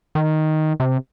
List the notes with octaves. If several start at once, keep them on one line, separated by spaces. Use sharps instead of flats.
D#3
C3